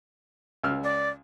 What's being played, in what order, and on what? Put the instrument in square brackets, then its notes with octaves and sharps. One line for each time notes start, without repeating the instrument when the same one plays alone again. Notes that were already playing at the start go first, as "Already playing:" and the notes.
[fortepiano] C#2 E6 F6
[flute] D5